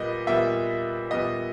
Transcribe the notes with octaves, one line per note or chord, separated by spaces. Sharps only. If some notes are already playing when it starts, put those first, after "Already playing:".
Already playing: A#2 G3 B3 D#5
A#2 G3 B3 E5
A#2 G3 B3 D#5